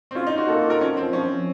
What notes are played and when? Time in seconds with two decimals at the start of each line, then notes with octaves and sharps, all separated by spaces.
0.11 C4
0.15 C#4 F4
0.27 D#4
0.33 F4 F#4
0.48 A#3 A4
0.65 F4
0.70 A#4
0.81 F3 C#4
0.97 F3 C4
1.13 F3 C#4
1.29 F3